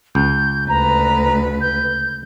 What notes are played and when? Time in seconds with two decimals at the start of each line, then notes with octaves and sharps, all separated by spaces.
0.15 C#2 G6
0.69 D2 B4 A#5
1.61 G6